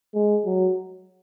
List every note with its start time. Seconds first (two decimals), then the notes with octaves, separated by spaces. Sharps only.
0.14 G#3
0.45 F#3